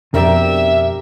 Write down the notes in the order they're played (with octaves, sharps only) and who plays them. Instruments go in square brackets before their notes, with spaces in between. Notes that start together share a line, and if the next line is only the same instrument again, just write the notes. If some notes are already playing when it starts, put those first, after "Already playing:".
[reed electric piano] F2 [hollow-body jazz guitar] B2 C4 D4 [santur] G4 A#4 [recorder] E5